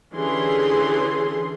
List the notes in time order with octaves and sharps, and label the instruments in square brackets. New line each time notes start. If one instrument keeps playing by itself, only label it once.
[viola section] D3 E3 C#4 G4 G#4 C6